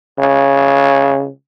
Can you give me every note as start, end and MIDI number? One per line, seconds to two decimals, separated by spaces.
0.19 1.29 49